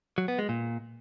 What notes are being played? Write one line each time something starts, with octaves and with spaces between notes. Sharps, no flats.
F#3
B3
G#3
A#2